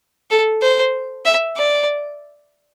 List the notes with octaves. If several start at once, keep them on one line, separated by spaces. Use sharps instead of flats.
A4
C5
E5
D5